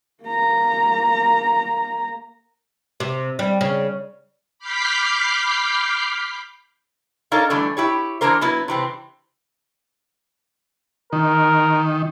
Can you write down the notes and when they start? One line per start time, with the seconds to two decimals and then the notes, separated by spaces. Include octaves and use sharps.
0.23 A#3 A#5
3.00 C3
3.39 G3
3.61 C#3
4.59 B5 D6 F6 G6 B6 C7
7.32 D#4 A4 A#4 C#5 D5 F5
7.50 D3 E3 G3 A3
7.77 E4 G4 C#5
8.21 E3 A#3 D4 A#4 C5
8.41 F#3 B3 E4
8.68 C3 E3 C4
11.13 D#3 A#4